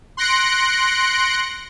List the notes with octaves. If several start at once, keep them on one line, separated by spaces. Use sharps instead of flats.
C6 F#6 A#6 C#7 D7